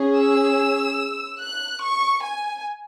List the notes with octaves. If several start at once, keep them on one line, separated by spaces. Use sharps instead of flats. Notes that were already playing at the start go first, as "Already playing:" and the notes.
Already playing: C#4 G#4
E6
F#6
C#6
G#5